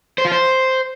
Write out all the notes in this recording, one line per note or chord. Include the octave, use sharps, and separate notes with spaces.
C5
F4
C5